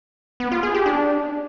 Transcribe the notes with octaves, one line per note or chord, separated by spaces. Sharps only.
B3
F4
G#4
G4
D4